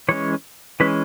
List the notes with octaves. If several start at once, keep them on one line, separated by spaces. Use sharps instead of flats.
E3 G#3 C#4 C#5
E3 G#3 C#4 B4